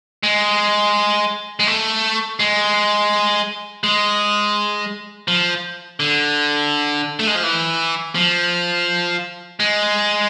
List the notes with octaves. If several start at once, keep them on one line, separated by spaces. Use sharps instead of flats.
G#3
G#3
A3
G#3
G#3
F3
D3
A3
G#3
F3
E3
F3
G#3